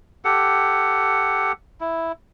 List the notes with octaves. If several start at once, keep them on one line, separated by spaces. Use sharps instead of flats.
G4 A4 F#5
E4